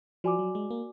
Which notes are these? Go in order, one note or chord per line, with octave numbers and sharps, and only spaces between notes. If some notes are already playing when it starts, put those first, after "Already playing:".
F3 F#4 D5 G#5 D6
F#3
G#3
A#3